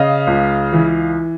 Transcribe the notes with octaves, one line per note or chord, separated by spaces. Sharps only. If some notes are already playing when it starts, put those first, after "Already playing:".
Already playing: C#3 D#5 F5
C#2
E3